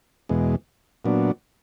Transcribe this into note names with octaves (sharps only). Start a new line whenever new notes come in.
E2 B2 G#3
A#2 F#3 B3 D4